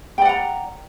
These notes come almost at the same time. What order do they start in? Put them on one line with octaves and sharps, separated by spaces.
G5 D5 F#5 A#5